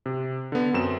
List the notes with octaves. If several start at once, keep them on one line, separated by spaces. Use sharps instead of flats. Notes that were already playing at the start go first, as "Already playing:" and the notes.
C3
D3 B3
F#2 C4 E7